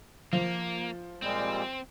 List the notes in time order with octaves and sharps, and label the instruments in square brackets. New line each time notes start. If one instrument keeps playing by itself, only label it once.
[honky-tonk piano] F3 [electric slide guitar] A#3
[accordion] A#2 G3 G#3 [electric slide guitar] C4